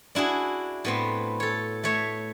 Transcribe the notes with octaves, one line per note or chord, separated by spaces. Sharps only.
D4 E4 F#4 G#4
A2 B3 C4
A4 C#5
A3 C#5 E5